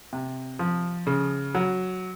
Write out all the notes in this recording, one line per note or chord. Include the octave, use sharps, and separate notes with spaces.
C3
F3
C#3
F#3